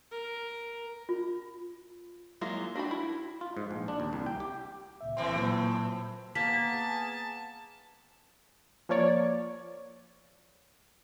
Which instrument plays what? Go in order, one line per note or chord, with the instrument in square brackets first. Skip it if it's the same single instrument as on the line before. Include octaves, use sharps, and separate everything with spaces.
[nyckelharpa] A#4
[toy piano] F4
[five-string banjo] F#3 G#3 A#3 E4 F4
D4 F#4 G4 B5
E4
[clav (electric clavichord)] F4
G#2
A#1
D4
D#2
C2
G5
G4
[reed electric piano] C#2 A#2 E5
[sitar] A2 E3 C4 [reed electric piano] C6
[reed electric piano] A#2 F#3
[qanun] A#3 [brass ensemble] B3 G#4 G#5 [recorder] A5 [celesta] B6
[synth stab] F3 A#3 C#5 D5